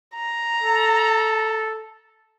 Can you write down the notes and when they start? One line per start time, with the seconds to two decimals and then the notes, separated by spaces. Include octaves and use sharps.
0.15 A#5
0.63 A4